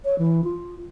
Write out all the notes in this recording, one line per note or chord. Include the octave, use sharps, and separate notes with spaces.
C#5
E3
F4